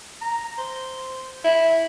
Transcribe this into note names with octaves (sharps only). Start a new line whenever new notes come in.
A#5
C5
E4